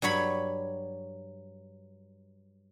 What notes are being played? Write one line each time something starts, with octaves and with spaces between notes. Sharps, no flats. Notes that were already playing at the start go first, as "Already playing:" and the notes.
G2 F#3 C#5 B5